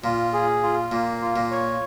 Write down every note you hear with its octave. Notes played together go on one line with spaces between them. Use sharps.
A#2 F4
G#4
F4
A#2 A#3
F4
A#2
C#5